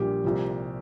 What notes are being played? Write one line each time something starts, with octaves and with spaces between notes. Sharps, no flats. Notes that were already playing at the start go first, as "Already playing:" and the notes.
Already playing: A#1 A#2 G3 A#3 G4
C2 A#2 F3